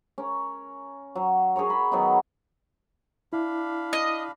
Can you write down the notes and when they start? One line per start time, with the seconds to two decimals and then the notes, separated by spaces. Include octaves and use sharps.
0.18 C#4 A#4
1.15 F#3
1.56 G#4 A#4 C#5 A#5
1.70 B5
1.92 D#3 F#3 B3 D#4
3.33 D4 E4 F5 B5
3.93 D#5